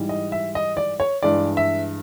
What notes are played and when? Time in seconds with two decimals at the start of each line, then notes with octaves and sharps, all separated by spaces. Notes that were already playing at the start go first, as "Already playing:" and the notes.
Already playing: G#2 E3 G3
0.09 D#5
0.32 E5
0.55 D#5
0.77 D5
1.00 C#5
1.23 G2 E3 G#3 D5
1.57 E5